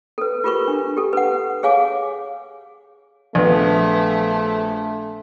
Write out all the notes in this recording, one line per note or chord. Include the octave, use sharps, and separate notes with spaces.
A4 B4
F4 G4 A#4 B4 C#6
D4
G4 A4
B4 F#5
G#4 C#5 F5 G#5 D6
A#1 A3 B3